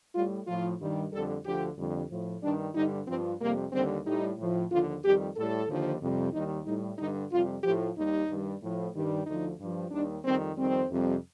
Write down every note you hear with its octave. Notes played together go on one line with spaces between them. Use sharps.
A2 G3 F4
A2 F3 F4
G2 D#3 G3
F2 D3 G3 A4
D2 D3 F3 G4
F2 D3 G3
A2 F3
G2 D#3 G3 D4
G2 D3 G3 D#4
G2 F3 C4
F2 C3 G3 A#3
D#2 D3 G3 C4
A2 G3 D#4
A2 F3
D#2 D3 F3 F4
F2 D#3 G3 G4
A2 G3 A4
D#2 D3 F3
F2 C3 G3
D#2 D#3 G3 D#4
A2 G3 D#4
G2 D3 G3 D#4
F2 C3 G3 F4
A2 F3 G4
D#2 D#3 G3 D#4
G2 D#3 G3
A2 F3
G2 D#3 G3
D2 D3 F3 D#4
G2 F3
D#2 D#3 G3 D4
F2 D#3 G3 C4
F2 D#3 G3 C4
F2 C3 G3